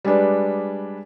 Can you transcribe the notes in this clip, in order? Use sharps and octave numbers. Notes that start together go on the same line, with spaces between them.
G3 G#3 D4 B4